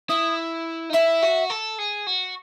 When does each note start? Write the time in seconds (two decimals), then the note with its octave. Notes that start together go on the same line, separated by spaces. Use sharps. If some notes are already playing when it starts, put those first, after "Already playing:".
0.09 E4 D#6
0.90 D#4
0.93 E4 E5
1.23 F#4
1.50 A4
1.79 G#4
2.07 F#4